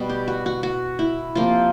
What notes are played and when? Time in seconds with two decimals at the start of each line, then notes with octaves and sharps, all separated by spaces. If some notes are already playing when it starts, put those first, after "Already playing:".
Already playing: B2 G3 B3
0.09 G4
0.28 F#4
0.46 F#4
0.63 F#4
0.99 E4
1.35 C3 F3 A#3 F4